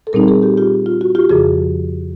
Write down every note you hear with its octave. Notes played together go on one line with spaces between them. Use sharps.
A4
A#2 G3 C4 D#4 G#4 A#4
G#4 A#4
G4 A4
F4 G4
F4
F#4
F4 G4
F2 C#3 F3 F#4 G#4